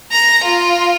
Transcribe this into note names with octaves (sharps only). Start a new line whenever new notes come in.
A#5
F4